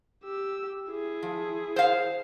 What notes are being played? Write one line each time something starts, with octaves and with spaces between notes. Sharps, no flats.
G4 E6
E4 G#4
F3
C5 C#5 F5